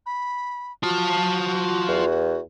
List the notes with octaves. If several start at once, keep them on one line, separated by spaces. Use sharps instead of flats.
B5
F4 F#4 A5
E2